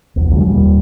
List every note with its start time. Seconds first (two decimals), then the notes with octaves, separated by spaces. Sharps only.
0.16 A#1 E2
0.31 F2 D3 F#3 G#3
0.48 D#2 A#2 G3